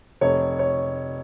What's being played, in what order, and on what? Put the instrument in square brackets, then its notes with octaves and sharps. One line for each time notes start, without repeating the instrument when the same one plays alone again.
[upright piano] F1 C#5
C#5